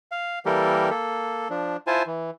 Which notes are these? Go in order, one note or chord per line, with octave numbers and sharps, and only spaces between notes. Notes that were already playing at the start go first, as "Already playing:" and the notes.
F5
E3 G3 A#3 G4 A4 A#4
A#3 A4
F3 D4
E4 F4 C5 G#5 A5
E3